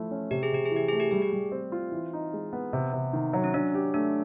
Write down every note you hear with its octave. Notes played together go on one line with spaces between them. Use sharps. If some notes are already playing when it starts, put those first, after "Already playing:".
Already playing: F3 A3 E4
C#4
C3 G4
G#4
C3 G4
G#4
E3
G4
A3 G#4
G4
G3 G#4
G4
G3
C4
F4
E3
D#4
G#3
B3
C3
C3
D#3
F#3
C#4
F#3 D4
G4
A3 D4